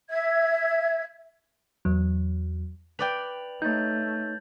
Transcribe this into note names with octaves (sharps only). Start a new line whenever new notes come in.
E5 G#6
E2 F#3
B4 D5 G5 F7 F#7
A3 D#4 C#5 G6 A6